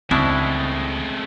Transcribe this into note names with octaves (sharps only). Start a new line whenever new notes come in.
C#2 B2 G#3 A3 C4 D4 E4